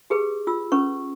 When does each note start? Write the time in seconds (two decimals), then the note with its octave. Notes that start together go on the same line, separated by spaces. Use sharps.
0.10 G4 G#4 B4
0.47 F4 E6
0.72 C#4 B4 C#6